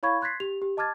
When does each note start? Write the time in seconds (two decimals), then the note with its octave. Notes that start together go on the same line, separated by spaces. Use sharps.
0.03 E4 C#5 F5 B5 C#6 G#6
0.22 C6 F#6 G#6 A6 B6 C7
0.40 G4 F7
0.62 G4
0.77 D#5 A5 D6 F6 G#6 A6